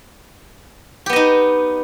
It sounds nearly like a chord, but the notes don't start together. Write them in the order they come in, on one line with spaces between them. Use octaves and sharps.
G4 B3 D#5 D#4